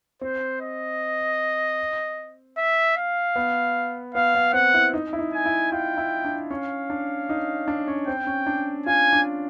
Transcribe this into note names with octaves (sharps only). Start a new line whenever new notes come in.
C4 C5
D#5
E5
F5
B3
B3 F5
B3
C4 F#5
E4
D#4
E4
D#4
G#5
E4
F4 G5
E4
D4
C#4 F5
D4
D#4
D4
C#4
C4 G5
C#4
D4
F4 G#5
D4